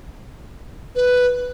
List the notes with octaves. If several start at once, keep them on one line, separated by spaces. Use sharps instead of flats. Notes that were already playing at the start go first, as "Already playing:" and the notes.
B4